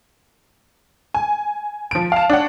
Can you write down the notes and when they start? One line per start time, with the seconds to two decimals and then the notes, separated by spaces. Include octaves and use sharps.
1.14 G#5
1.91 F3 D7
2.12 F5 A5
2.30 D4 C#5 F#5